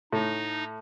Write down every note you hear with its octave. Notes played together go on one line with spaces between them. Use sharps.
A2 D#4